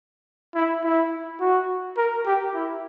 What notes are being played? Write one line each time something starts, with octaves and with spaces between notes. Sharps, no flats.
E4
E4
F#4
A#4
G4
E4